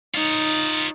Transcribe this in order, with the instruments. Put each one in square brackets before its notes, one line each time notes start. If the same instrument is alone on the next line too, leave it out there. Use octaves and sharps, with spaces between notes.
[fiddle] D#4 [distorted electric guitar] F4 C#5